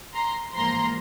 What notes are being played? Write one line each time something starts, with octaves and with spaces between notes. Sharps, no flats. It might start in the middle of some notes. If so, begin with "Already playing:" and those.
A#5 C6
A1 G#2 F3 A#3 A#5 C6